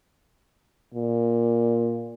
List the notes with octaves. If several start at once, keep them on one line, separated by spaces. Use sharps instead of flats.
A#2